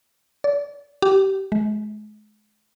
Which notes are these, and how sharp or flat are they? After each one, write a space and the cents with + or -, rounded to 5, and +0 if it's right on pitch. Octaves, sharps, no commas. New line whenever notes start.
D5 -30
G4 -20
G#3 +35